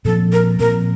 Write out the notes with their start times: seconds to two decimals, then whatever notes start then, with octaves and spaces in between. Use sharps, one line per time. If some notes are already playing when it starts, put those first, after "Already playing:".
0.05 A#2 F3 C4 A4
0.33 A#4
0.59 A#2 F3 C4 A#4